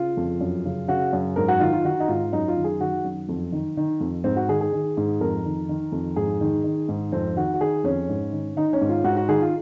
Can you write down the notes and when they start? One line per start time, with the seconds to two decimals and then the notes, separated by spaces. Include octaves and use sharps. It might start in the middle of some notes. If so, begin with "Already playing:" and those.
Already playing: C#3 F4
0.17 F2
0.41 F#2
0.65 C#3
0.88 C#3 F#4
1.13 F#2
1.36 G#2 A#4
1.48 F#4
1.60 D#3 F4
1.73 F4
1.85 D#3 F#4
2.00 D#4
2.08 G#2 F4
2.32 F#2 D#4
2.48 F4
2.57 D#3
2.64 G#4
2.81 D#3 F#4
3.04 F#2
3.29 F2
3.52 D#3
3.77 D#3
4.01 F2
4.24 G#2 C4
4.36 F#4
4.49 D#3 G#4
4.61 G#4
4.72 D#3
4.97 G#2
5.21 F2 A#4
5.45 D#3
5.69 D#3
5.92 F2
6.16 G#2 G#4
6.41 D#3
6.64 D#3
6.89 G#2
7.12 F2 C4
7.36 D#3 F#4
7.54 F#4
7.61 D#3 G#4
7.84 F2 C#4
8.09 G#2
8.32 D#3
8.57 D#3 D#4
8.73 C#4
8.81 G#2
8.89 F4
9.04 G#2 F#4
9.17 F#4
9.28 D#3 G#4
9.41 F4